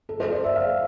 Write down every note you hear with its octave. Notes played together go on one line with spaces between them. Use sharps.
A4
C5
D5
E5
F5